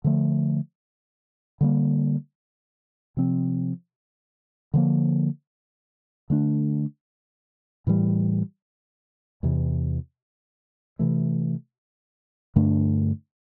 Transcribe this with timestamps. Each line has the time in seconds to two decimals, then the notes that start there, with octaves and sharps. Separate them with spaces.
0.04 D3 F3 A3
1.61 D3 G3 A#3
3.17 C3 F3 C4
4.74 D3 F3 A#3
6.30 D3 A3 D4
7.87 A2 E3 G3
9.43 E2 C3 E3
10.99 C3 E3 A3
12.56 G2 D3 A3 D4